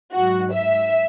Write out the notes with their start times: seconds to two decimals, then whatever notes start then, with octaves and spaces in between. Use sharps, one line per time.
0.12 G#2 F#3 F#4
0.54 E5